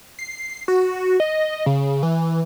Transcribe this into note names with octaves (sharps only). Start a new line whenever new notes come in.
C7
F#4
D#5
C#3
E3